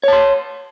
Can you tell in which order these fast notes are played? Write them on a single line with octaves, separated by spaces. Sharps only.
C#5 A5 C6